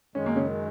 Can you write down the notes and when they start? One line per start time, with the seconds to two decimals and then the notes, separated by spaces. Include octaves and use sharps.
0.15 F#2 D#3 G#3 C#4
0.26 A#3
0.36 C#3 C#4